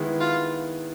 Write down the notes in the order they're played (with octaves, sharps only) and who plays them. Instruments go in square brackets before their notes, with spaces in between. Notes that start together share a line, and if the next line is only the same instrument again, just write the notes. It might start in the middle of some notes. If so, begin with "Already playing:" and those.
Already playing: [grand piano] D#3 G#3 B3 E4
[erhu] F4